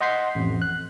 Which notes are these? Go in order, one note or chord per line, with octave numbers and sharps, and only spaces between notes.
D#5 F#5 C6 G6 B6 C7
A1 F2
F#6